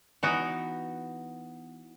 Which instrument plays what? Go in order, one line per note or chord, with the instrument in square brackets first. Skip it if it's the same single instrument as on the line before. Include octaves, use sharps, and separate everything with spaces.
[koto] E3 B3 D#4 F#4